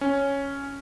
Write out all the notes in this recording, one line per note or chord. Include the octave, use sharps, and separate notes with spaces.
C#4